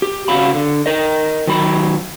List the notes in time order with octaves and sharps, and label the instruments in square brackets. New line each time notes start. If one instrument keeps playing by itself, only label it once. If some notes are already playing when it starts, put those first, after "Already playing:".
[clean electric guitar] G4
C#3 C#4 F#4 F5 B5
D3
A#4 D#5
D#3 F#3 B5